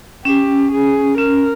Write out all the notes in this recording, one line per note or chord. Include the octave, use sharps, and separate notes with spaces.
C#4 G4
G#4
C#4 A#4